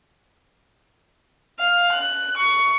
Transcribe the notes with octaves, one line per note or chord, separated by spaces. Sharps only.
F5
F#6
C#6